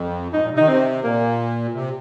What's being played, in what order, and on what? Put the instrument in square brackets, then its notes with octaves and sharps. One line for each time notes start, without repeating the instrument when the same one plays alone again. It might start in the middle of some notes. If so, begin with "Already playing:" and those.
Already playing: [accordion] F2
[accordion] G#2 [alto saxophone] D#4
[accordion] A#2
C3
[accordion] D#3 [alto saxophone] D#4
[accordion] C3 [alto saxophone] C4
[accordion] A#2 [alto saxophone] A#3
[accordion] C3